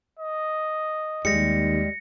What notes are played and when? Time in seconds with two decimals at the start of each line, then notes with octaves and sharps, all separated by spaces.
0.19 D#5
1.25 D#2 G3 G#3 A#6 C#7